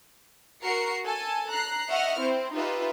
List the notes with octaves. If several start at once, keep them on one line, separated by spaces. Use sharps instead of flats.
F#4 A#4 C7 C#7
A4 G#5 A5
A#5 F#6 C7
D#5 E5 F#5 C#6 F6
C4 E4 C5
D#4 F4 G4 B4 E5